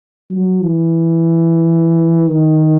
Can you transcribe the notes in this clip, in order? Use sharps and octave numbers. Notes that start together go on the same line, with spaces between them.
F#3
E3
D#3